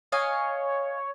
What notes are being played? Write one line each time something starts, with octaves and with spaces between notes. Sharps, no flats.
C#5 D#5 F5 G#5